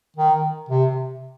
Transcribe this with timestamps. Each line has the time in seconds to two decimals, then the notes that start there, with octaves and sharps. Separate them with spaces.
0.16 D#3
0.69 C3